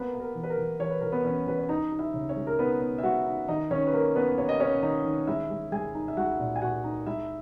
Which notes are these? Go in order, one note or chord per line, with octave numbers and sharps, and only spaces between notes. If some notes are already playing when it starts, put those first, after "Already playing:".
Already playing: A#3 B3 B4
A#3
A#4
E3
B4
A#4
E3
E3 C#5
B4
E3 A#4
B3 B4
E3 C#4 C#5
E3 B4
C#5
D#4 D#5
D#4
E4 E5
C#3
C#4 C#5
G#3
A#4
B3 D#4 B4
B3
E5
G#3 F#4 F#5
D#4
D#3 D#4 D#5
D#3 C#4 C#5
B4
A#3 A#4
B3 C#4 B4
A#3 C#5
D#5
C#4 C#5
D#3 D#4 D#5
D#3
G#3 E4 E5
G#3
G#3 G#4 G#5
D#4
E5
G#3 F#4 F#5
A#2
G#5
A#2 F#4 F#5
D#4
G#3 E4 E5